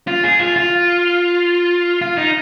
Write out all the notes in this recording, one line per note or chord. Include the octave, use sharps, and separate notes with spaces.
F4
G#4
F4
F4
F4
D#4